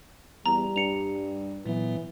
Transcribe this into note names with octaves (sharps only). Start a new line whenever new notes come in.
E2 G3 A#5
G2 C#7 F7
A#2 E3 F#3 B3